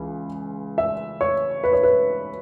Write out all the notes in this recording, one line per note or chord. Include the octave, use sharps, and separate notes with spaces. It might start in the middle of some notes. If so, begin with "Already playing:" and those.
Already playing: C#2 E3
E5
C#5
B4
C#5
B4